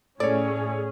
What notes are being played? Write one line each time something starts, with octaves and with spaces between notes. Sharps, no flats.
A2 C#4 G#4 A4 C#5 D5